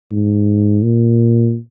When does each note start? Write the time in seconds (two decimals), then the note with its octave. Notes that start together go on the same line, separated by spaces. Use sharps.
0.12 G#2
0.83 A#2